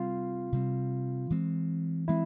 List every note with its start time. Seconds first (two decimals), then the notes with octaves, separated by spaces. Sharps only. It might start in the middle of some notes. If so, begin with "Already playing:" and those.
Already playing: C3 G3 C4 F4
0.52 C3 G3 C4
1.30 E3 G#3 C4
2.08 E3 G#3 C4 E4